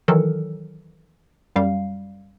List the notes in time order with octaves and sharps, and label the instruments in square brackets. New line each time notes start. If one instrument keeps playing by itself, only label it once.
[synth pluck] D#3 E3 F#3 A4 A#4
F#2 G3 F5